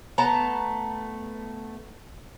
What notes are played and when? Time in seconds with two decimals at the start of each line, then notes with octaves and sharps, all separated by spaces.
0.18 A3 B3 A5 A#5